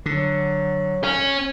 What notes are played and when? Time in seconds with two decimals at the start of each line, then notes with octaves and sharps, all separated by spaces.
0.06 D3 F#3
1.04 C#4